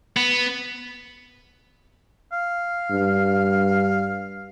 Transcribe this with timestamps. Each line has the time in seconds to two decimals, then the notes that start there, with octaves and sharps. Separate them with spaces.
0.17 B3
2.32 F5
2.91 G2